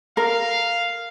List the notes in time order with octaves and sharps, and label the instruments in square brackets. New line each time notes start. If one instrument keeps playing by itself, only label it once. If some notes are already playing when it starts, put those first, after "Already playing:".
[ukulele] A#4 [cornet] F5